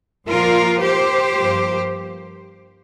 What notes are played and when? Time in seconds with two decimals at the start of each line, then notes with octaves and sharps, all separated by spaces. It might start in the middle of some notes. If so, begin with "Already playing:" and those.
0.27 A#2 F3 A#3 F4 A#4
0.81 G4 C5
1.35 G2 F3 A#3